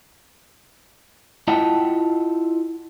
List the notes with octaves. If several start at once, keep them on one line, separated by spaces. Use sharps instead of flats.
E4 F4 D#5 F#5 G5 A5